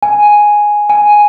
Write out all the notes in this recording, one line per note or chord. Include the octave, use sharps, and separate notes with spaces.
G#5
G#5